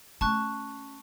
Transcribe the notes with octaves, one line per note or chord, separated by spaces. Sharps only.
A3 C#4 A5 C#6 F#6